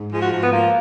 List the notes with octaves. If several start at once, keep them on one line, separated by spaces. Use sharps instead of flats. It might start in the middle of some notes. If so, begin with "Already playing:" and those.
Already playing: G#2
F3 G#4
F#4
G#2 F#4
B3
F3 A#3